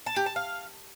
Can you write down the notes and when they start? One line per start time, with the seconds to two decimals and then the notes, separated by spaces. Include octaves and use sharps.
0.06 A5
0.16 G4
0.26 A5
0.36 F5